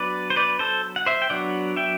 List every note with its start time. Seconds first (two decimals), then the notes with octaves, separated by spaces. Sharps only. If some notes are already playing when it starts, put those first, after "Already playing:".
Already playing: F#3 B3 D4 B4 D5
0.30 C5
0.36 B4 D5
0.59 A4 C5
0.96 F#5
1.06 C5 E5
1.22 G5
1.30 F#3 B3 D4 D5 F#5
1.76 E5 G5